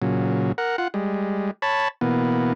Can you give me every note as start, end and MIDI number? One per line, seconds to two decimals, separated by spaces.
0.02 0.52 46
0.02 0.52 49
0.02 0.52 54
0.58 0.76 70
0.58 0.76 78
0.78 0.88 65
0.78 0.88 78
0.94 1.51 55
0.94 1.51 56
1.62 1.88 73
1.62 1.88 81
1.62 1.88 83
2.01 2.53 47
2.01 2.53 52
2.01 2.53 58
2.01 2.53 59